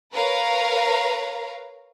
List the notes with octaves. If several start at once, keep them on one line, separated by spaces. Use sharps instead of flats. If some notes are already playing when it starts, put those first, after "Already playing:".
A#4 B4 C#5 F5 A#5